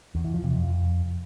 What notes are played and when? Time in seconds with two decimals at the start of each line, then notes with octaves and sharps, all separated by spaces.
0.15 E2
0.24 E3
0.34 F3
0.44 C3
0.54 F2